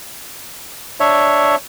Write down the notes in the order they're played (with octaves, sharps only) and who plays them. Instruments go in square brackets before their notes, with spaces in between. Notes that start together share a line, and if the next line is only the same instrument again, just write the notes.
[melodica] D4 C#5 E5